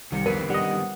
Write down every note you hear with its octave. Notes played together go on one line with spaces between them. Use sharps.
C2 D#3 C#7
F1 D3 D#3 B3 A#4 B4 C7
G3 D#5 F#5